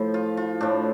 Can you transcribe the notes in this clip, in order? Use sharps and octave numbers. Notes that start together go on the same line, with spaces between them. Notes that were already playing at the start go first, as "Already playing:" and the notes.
Already playing: A2 F3
F4
F4
A2 F3 D4